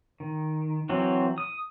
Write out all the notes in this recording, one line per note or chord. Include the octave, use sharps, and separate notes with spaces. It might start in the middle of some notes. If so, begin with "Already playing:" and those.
D#3
E3 F#3 C4
D#6